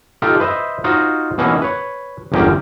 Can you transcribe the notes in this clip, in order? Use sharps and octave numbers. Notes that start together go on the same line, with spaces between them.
D#4 F4 G4 A4
B4 C5 D#5 E5
D#4 F4 F#4 C5 D#5
B2 E3 A#3 C#4 D#4
B4 C#5
G1 E2 A#3 C#4 G4